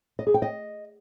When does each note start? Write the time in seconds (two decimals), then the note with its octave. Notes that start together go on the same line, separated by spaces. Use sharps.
0.19 D#5
0.27 G#4
0.34 G5
0.42 D#5